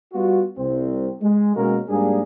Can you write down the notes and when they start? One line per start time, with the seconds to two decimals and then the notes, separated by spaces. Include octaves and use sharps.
0.13 G3 B3 F4 F#4
0.58 C2 C4
1.22 G#3
1.56 B2 G#3 A#3 C#4 F#4 A#4
1.89 G#2 G3 A#3 D4 G#4